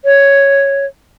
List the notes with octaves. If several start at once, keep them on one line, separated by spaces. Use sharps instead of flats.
C#5